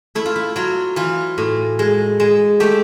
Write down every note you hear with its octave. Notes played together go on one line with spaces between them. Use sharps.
A3 E4
F4
E4
F#3 F4
E3 F4
A2
G#3
G#3
A3 G4